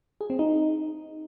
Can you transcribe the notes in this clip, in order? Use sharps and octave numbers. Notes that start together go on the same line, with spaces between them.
G#4
C4
D#4